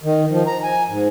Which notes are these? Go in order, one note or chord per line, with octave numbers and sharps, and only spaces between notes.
D#3
F3
A#5
G#5
G#2